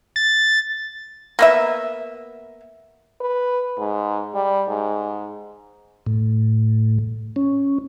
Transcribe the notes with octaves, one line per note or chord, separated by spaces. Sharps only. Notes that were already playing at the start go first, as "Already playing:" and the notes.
A6
A#3 B3 E5
B4
G#2
G3
G#2
A2
C#4